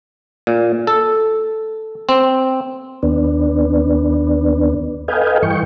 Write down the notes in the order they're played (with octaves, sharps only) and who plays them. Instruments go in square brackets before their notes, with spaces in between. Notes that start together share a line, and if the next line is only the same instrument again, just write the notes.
[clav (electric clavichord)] A#2
A4
C4
[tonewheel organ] D#2 B3 D4
A4 B4 D#5 F5 G5 G#5
G2 E3 G5 C#6